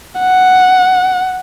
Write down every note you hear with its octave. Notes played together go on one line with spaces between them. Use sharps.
F#5